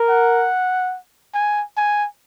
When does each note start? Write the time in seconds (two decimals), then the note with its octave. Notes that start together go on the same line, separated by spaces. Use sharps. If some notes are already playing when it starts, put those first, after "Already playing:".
Already playing: A#4
0.09 F#5
1.34 G#5
1.77 G#5